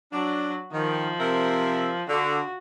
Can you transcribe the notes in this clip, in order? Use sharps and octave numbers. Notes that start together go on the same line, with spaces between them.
F#3 D4
D#3 F3
C3 A#4 E5
D3 F#4